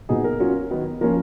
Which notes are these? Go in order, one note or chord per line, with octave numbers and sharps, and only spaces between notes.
A#2 F#3 B3 D#4 G#4
A#4
F#3 C#4 F4
D#3 F#3 B3
F3 A#3 C#4 F4 A#4